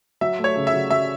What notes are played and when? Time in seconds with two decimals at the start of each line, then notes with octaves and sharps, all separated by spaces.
0.21 F#3 E5
0.39 A3
0.44 C#5
0.56 C#3
0.67 E5
0.73 F#3
0.90 F#3 E5